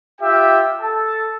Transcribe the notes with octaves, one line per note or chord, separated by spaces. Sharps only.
F4 G4 E5 G5
A4 A5